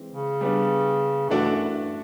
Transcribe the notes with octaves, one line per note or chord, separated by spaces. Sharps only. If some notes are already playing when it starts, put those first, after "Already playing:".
Already playing: E3 G#3 C4
C#3
G3 B3 D4
G2 E3 A3 D4 F#4 A4
F#2
G2